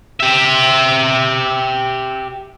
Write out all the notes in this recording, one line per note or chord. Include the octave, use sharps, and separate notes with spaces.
G4 E5